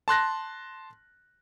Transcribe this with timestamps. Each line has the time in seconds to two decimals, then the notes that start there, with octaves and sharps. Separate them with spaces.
0.08 A5 C6 F#6 A#6